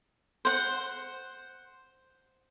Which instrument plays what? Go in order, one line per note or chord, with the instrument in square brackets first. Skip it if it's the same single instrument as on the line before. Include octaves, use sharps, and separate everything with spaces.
[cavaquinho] C5 F#5